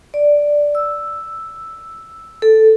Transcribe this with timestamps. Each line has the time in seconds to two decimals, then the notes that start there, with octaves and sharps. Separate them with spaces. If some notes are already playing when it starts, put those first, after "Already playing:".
0.14 D5
0.75 E6
2.42 A4